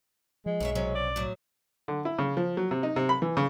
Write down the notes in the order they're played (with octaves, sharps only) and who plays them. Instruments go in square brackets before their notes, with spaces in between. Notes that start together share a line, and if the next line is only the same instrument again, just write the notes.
[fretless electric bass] F3 [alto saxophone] G#3
[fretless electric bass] B1 [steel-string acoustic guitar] F#2 C#5 E5
[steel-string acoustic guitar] C3 F#3 C#4
[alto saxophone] D5
[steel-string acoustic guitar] A2 F#3
[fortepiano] D3
E4
C#3
F3
F#3
C3
D#4
C3
B5
E3
C#3